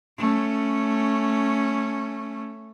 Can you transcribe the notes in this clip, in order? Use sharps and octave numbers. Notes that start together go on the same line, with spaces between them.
A3 C#4